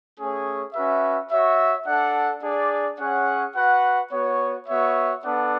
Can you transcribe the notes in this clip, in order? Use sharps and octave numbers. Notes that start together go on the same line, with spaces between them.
A3 C#4 G#4 C#5
C#4 F#4 B4 E5
F#4 C#5 E5
D4 A4 D5 F#5
D4 G#4 D5
C#4 G#4 C#5 F#5
F#4 B4 F#5
B3 F#4 C#5
B3 F#4 C#5 E5
B3 D4 A4 D5 F#5